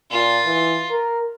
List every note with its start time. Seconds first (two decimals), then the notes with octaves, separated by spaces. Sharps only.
0.11 A#2 F4
0.45 E3
0.90 A#4